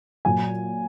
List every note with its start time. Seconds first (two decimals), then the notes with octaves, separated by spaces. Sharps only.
0.25 A#2 F#3 G#5